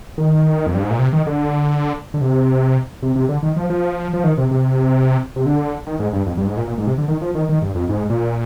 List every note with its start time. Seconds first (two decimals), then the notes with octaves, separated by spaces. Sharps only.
0.18 D#3
0.67 F2
0.75 G2
0.83 G#2
0.91 A#2
0.99 C3
1.13 D#3
1.27 D3
2.14 D3
2.21 C3
3.02 C3
3.16 C3
3.29 D3
3.43 D#3
3.56 F3
3.70 F3
4.13 F3
4.24 D#3
4.37 C3
4.51 C3
5.36 C3
5.46 D3
5.87 D#3
6.00 G#2
6.13 G2
6.26 F2
6.37 G2
6.47 G#2
6.57 A#2
6.67 A#2
6.78 G#2
6.87 C3
6.98 D3
7.08 D#3
7.22 F3
7.35 D#3
7.49 D#3
7.62 G2
7.75 F2
7.89 G#2
8.10 A#2